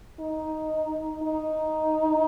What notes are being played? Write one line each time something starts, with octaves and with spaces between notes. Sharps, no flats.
D#4
D#4